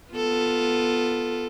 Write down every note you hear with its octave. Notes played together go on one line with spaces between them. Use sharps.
B3 F4 A4